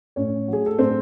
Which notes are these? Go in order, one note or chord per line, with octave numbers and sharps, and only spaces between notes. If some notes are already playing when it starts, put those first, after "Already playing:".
A2 C#4 C#5
F#3 A3 G#4
A4
A2 C4 C5